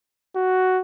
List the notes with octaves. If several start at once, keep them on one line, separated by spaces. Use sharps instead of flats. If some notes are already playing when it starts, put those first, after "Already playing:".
F#4